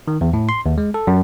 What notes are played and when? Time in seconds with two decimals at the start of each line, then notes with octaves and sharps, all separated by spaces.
0.08 D#3
0.21 E2
0.33 A2
0.49 C6
0.66 D#2
0.78 G#3
0.94 A4
1.07 F#2